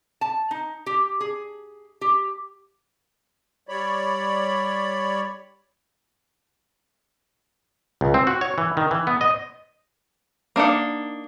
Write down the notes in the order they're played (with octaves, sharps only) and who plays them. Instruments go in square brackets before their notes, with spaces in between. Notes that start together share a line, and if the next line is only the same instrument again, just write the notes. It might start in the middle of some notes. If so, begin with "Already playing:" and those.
[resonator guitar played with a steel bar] A5
D#4
G4
G#4
G4
[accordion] G3 C#5 D5 B5
[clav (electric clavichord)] C#2
C4
F#4
C#5
E3
D#3
E3
B3
D#5
[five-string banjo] A#3 D4 D#4 F#5